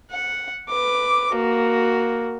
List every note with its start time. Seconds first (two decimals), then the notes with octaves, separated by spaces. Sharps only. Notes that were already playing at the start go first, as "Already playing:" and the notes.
0.11 F#5
0.69 B4 D6
1.33 A#3 F#4